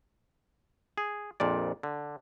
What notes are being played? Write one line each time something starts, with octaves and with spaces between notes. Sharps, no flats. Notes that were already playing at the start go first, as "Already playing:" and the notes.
G#4
A#1 F2 A#2 D5
D3